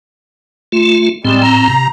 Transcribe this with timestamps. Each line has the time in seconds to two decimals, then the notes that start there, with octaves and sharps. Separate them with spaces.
0.72 A3 F4
1.25 A2 G3 G#3 C4
1.43 A#5
1.69 C3